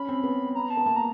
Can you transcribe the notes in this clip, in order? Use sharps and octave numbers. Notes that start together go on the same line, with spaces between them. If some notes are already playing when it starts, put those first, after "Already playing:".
Already playing: C#4 B5
C4
B3
A#5
A5
B3
A#3 A5
A#5